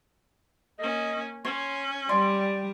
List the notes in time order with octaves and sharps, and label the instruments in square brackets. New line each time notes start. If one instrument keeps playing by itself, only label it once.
[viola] A#3 C#4 [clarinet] D#5
[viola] C#4 [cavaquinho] C#5 [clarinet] C6
[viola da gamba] G3 [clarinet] D5 [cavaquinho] C6